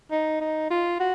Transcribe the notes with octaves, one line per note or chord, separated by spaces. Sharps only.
D#4
D#4
F4
F#4